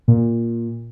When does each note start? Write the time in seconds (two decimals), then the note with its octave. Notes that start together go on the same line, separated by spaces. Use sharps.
0.08 A#2